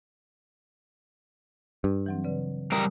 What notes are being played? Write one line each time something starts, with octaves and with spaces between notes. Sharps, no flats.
G2
E3 F#3 C4
C#3 B4 D5
G3 A#4 D#6